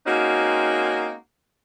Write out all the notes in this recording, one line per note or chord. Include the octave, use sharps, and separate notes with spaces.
G#3 A#3 C4 C#4 D#4 F#4